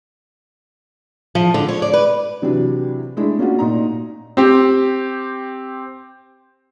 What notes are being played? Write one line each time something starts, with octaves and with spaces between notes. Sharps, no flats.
F3
D3
C#5
D5
B4
C3 E3 F#3 D4
G#3 A3 D4 E4
A3 A#3 C#4 D4 F4 F#4
A#2 D#4 A#5
C4 G4